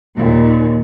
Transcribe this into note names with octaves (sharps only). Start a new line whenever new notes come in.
D#2 A#2